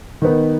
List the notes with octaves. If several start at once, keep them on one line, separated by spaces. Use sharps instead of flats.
D#3 B3 D#4